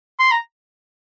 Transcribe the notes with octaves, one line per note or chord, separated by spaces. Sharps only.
C6
A#5